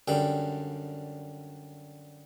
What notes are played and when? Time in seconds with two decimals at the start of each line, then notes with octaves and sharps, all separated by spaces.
0.08 F#2 D3 G3 G5